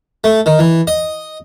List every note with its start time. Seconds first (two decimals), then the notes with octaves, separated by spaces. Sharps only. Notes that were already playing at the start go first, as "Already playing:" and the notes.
0.24 A3
0.46 D#3
0.59 E3
0.87 D#5